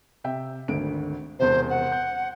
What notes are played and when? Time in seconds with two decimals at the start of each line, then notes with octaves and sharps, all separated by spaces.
0.24 C3 E5 G5
0.68 G#1 D2 D7
1.40 E1 E2 C3 C5
1.70 F#5
1.92 G6